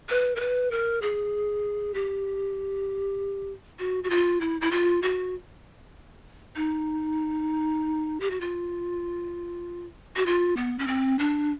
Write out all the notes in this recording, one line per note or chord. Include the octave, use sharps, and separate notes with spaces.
B4
A#4
B4
A#4
G#4
G4
F#4
F#4
F4
E4
E4
F4
F#4
D#4
G4
F#4
F4
F#4
F4
B3
C#4
C4
D4